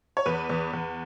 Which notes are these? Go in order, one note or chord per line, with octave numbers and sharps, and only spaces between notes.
C#5
E2 B4
E2
E2